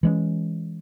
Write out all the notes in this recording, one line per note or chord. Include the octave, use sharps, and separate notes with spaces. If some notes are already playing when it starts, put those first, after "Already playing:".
E3 G#3 C#4